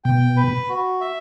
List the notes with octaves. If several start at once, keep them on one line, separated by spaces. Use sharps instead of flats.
B2 G5
B4
F#4
E5